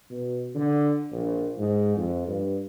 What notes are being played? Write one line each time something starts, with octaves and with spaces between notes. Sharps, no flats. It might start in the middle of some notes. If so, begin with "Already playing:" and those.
B2
D3
A#1
G#2
F2
G2